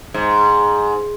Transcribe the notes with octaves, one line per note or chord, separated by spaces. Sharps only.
G#2